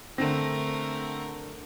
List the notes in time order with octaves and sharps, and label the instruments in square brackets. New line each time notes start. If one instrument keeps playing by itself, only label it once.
[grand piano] D3 A#6 [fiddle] A3 A#4 [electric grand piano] C4